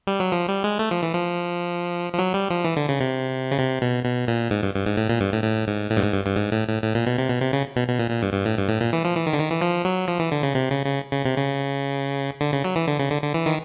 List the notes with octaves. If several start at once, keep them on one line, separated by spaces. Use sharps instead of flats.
G3
F#3
F3
G3
G#3
A3
F3
E3
F3
F3
F#3
G3
F3
E3
D3
C#3
C3
C#3
C3
B2
B2
A#2
G#2
G2
G2
G#2
A2
A#2
G2
A2
A2
G#2
A2
G2
G#2
G2
G2
G#2
A2
A2
A2
A#2
B2
C3
B2
C3
C#3
B2
B2
A#2
A#2
G2
G2
A2
G2
A2
A#2
E3
F3
E3
D#3
D3
D#3
E3
F3
F#3
F3
E3
D3
C#3
C3
C#3
C#3
C#3
C3
C#3
D3
C#3
F#3
E3
D3
C#3
D3
D3
E3
D#3